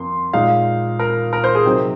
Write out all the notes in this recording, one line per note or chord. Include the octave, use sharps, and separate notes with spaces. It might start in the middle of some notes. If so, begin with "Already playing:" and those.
Already playing: F2 A#3 C6
A#2 G#3 D#4 F5
A#4
A#4
C5
G#4
C3 F#3 C4 D#4